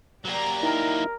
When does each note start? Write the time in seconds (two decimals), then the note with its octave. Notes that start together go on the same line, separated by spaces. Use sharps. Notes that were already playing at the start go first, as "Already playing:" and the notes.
0.25 F#3 A#3 G4 D5 A#5
0.63 D#4 E4 A#4